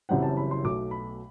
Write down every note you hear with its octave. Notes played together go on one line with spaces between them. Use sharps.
F#1 F#2 E3 G3 C4 F#5
A5
B5
C6
B1 B2 A3 D6
B5